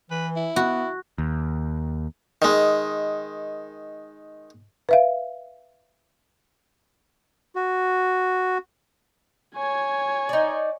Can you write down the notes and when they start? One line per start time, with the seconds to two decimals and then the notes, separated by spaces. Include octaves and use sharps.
0.10 E3 B4
0.36 E4
0.56 B3 F#4
1.18 D#2
2.42 D#3 G#3
4.89 B4 E5 F5
7.56 F#4
9.55 C#5 G#5
10.29 D#4 D5